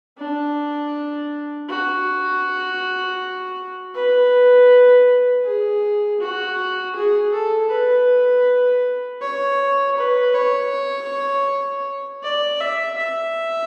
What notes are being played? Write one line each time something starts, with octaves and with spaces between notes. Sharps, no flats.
D4
F#4
B4
G#4
F#4
G#4
A4
B4
C#5
B4
C#5
D5
E5
E5